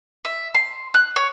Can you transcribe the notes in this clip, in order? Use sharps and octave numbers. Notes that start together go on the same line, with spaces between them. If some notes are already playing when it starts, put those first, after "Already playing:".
E5
C6
F#6
C#5